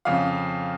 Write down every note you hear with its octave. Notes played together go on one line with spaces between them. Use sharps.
F2 C#3 F5